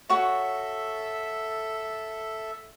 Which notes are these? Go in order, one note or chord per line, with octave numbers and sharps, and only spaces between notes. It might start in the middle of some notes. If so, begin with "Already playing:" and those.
F#4 A4 C#5 E5